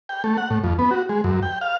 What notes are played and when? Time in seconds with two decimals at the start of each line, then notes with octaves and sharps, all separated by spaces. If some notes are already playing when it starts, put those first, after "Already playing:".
0.09 G5
0.24 A3
0.38 F#5
0.50 A2
0.64 F2
0.79 B3
0.91 F#4
1.09 G#3
1.24 F#2
1.43 G5
1.61 F5